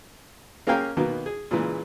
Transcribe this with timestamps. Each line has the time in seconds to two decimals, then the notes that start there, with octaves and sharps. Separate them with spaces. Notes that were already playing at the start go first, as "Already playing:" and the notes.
0.67 A#3 C#4 G#4 A#4 F5 G5
0.97 B2 D#3 A#3 B3
1.26 G#4
1.51 A#2 C#3 E3 G#3